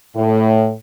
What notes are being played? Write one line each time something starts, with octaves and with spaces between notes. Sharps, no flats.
A2